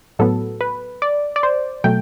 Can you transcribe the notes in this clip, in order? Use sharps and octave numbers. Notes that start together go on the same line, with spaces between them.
A2 F#3 B3 A4
B4
D5
D5
C5
B2 F#3 A3 G5